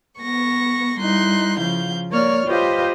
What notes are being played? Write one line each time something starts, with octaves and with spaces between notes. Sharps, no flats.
B3 C#6 A#6
G3 D#4 E4 C6 F#6
C#3 F3 F5 G6
A#3 C#5 D5 F6
F4 G4 B4 C5 D#5 F5